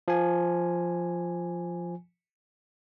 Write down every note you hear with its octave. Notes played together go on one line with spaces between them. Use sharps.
F3 G#5